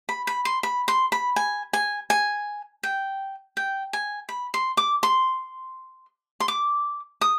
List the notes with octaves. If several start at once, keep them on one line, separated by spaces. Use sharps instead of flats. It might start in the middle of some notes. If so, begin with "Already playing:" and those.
B5
B5
C6
B5
C6
B5
G#5
G#5
G#5
G5
G5
G#5
B5
C6
D6
C6
C6
D6
D#6